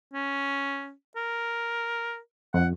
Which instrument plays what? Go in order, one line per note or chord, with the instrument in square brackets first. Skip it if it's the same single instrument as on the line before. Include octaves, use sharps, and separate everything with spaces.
[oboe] C#4
A#4
[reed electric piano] F2 [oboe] F#5